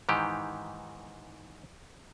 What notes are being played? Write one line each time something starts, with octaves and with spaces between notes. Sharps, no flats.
G#2 D#3 E3 G4